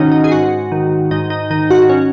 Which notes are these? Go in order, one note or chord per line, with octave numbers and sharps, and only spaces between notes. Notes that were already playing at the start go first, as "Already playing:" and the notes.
Already playing: G#2 D#3 C#4 D#4 F#4
D#4
G#4
G#2 F#4
D#3
G#2 D#4
D#4
D#3 D#4
F#4
C#4